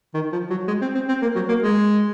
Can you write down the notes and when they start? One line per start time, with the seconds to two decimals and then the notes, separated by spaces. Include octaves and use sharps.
0.14 D#3
0.32 F3
0.50 F#3
0.68 G#3
0.82 C4
0.95 C4
1.08 C4
1.22 A#3
1.35 F#3
1.49 A#3
1.63 G#3